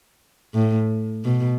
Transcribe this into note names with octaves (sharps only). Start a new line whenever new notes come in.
A2
B2